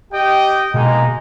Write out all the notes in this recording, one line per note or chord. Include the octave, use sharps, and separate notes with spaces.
G4 D#5 G5
B2 G#3 A#3 D#4